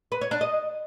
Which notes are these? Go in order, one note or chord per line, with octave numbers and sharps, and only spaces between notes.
B4
C#5
D4
D#5